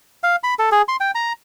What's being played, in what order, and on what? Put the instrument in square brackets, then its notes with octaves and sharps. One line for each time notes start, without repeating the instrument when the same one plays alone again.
[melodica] F5
B5
A4
G#4
C6
G5
A#5